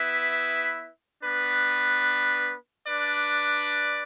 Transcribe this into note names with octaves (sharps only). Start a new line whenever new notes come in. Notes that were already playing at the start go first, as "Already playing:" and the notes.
Already playing: B3 E4 B4 E5
B3 D4 B4
D4 B4 D5